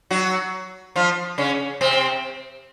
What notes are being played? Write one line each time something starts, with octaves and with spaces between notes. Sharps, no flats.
F#3 F#4
F3 F4
C#3 C#4
C3 C4